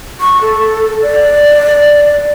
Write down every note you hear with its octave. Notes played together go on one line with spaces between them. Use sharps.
C#6
A4
D5